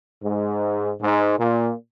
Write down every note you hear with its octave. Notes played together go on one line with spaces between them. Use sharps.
G#2
G#2
A#2